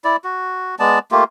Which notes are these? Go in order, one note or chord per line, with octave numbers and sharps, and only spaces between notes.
E4 D5
F#4
G#3 B3 D5 A5
A3 A#3 F4 G4